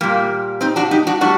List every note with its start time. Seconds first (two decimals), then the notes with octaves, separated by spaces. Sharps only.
0.01 A#2 G3 A#3
0.61 C4 D#4
0.76 D4 F#4
0.91 D#4 G4
1.07 D4 F#4
1.21 A2 G3 D4 F#4